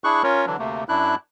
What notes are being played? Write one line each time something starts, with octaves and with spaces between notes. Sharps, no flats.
D4 E4 G#4 C#6 F#6
C#4 F4 A#4 C#5
D3 E3 F#3 D4
D2 C3 A3 A#3
F#2 D4 E4 F#6